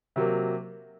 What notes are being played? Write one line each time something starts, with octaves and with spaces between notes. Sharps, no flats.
C3 F#3 A#3